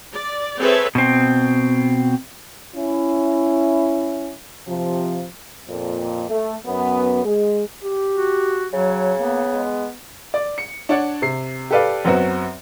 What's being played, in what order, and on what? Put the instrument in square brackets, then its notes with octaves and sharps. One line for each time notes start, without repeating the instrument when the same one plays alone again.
[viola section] D5
C4 G#4 A4 B4 C#5 E5
[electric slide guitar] B2 C4
[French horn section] C#4 E4
C3 F3
F2 A#2
A3
F#2 B3
G#3 G#4
[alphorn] G4
[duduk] F#4
[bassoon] C#3 [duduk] F#3
[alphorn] A#3 [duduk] B3
[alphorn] G#3
[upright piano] D5
C#7
D4 C#5 D5 F#5
C3 C7
G4 A4 B4 D5 F5
F#2 F#3 B3 C4 F#4